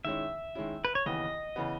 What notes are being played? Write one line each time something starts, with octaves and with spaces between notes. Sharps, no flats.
D#3 G#3 C#4 E4 E5
D#3 G#3 C#4 E4
B4
C#5
D#2 C#3 E3 B3 D#5
C#3 E3 B3